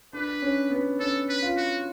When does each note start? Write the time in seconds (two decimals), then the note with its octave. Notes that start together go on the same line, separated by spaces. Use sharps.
0.13 D4 B4
0.42 C#4
0.71 B3
1.00 C#4 A4
1.29 B4
1.42 F4
1.57 F#4